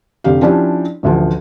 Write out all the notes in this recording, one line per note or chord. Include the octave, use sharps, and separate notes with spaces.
F1 D3 G4 F5
F3 C#4 D4 E4 G4
A1 D2 F3